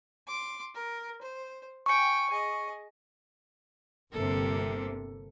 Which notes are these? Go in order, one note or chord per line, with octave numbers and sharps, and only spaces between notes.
C6 D6
A#4
C5
G5 G#5 C#6 C#7
G#4 D#5
G1 C3 A#3 A4